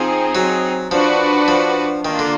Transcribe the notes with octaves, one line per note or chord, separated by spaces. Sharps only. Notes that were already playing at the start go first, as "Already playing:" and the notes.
Already playing: F3 C4 D#4 G#4
F#3
F3 D4 F#4 B4 D5
F3
D#3 A#3 D4 F4
D3